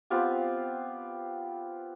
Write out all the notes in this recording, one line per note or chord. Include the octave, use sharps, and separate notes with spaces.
B3 C4 F4 G4